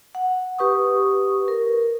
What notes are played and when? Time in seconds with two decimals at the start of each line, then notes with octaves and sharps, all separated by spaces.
0.15 F#5
0.59 G4 B4 C#6 D#6
1.48 A#4